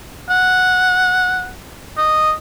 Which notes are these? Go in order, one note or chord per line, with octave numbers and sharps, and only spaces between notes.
F#5
D#5